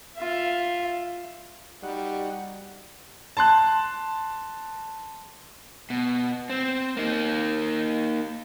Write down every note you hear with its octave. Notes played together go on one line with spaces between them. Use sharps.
F4 E5
G3 D#4 F#4 F#5
A5 C6 F#6
B2
C4
A#3 D#4